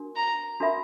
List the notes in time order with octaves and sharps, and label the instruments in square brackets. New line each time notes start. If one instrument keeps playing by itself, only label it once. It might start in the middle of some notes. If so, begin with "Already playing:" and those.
Already playing: [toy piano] D4 F#4 A#4
[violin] A#5
[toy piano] D4 F#4 A#4 E5 B5